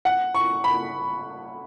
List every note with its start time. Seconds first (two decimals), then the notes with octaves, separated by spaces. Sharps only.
0.05 F#5
0.34 C#6
0.64 B5